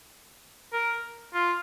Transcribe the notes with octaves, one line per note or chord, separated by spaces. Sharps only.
A#4
F4